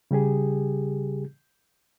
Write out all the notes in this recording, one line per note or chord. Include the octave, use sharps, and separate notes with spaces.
C#3 G3 G4 G#4